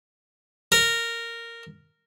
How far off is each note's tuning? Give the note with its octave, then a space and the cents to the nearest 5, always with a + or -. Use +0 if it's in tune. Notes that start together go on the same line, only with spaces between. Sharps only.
A#4 -10